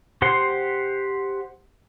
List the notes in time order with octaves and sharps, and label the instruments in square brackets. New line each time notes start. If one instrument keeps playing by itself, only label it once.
[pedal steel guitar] G4 C5 F#5 C6